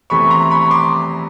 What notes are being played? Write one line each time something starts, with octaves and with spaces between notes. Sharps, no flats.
E2 C3 E3 A3 B5 C#6
A#5 C6
B5 C#6
C6 D6